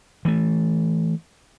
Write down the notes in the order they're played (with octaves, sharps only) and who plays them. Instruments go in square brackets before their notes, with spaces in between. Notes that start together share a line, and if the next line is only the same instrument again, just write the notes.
[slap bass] E3 A3